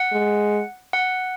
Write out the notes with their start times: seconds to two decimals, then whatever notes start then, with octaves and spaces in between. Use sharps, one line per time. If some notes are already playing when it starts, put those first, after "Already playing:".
Already playing: F#5
0.13 G#3
0.93 F#5